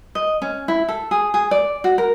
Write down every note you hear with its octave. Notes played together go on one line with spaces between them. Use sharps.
D#5
C#4
E4
A4
G#4
G#4
D5
F#4
A#4